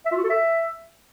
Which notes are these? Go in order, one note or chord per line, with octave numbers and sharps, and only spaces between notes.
E5
F4
F#4
A4
E5